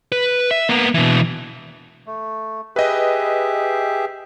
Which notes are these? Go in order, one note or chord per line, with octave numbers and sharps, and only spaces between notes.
B4
E5
A#3 B3
B2 E3
A3
G4 G#4 B4 D#5 E5